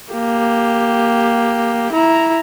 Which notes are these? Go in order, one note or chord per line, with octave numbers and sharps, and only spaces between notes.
A#3 G4
E4 A#5